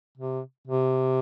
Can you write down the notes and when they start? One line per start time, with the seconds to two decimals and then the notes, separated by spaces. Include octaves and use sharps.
0.18 C3
0.67 C3